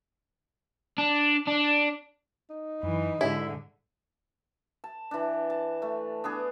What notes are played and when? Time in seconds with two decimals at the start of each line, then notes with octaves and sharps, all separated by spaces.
0.98 D4
1.48 D4
2.50 D#4
2.83 F#2 E3
3.21 G#2 D3 E4 G4 E5 B6
4.84 A5
5.11 E3 D4
5.50 A5
5.82 A3
6.24 B3 D4 G#4